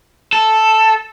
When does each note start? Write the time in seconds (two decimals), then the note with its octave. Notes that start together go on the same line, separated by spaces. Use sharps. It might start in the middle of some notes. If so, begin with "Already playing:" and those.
0.33 A4